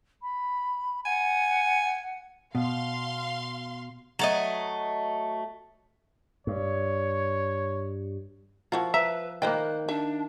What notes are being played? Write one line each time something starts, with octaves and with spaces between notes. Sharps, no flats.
B5
F#5 G#5
B2 F5 C6
F#3 A3 D#5
G2 C#5
F3 E4 F#4 A#4
B4 E5 A#5
D#3 A#3 B4 C5 G5 F#6
D4 E5